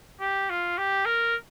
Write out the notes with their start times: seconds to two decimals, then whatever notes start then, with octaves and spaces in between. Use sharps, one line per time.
0.21 G4
0.50 F4
0.78 G4
1.06 A#4